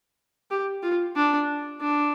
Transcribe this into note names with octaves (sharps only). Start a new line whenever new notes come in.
G4
F4
D4
D4